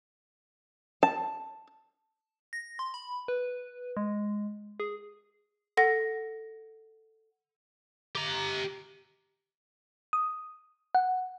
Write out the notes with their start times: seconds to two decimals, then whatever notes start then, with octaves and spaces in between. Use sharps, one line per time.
1.03 A5
2.53 A#6
2.79 C6
2.94 B5
3.28 B4
3.97 G#3
4.80 G#4
5.77 A4 F#5 A#6
8.15 G4 A#5
10.13 D#6
10.95 F#5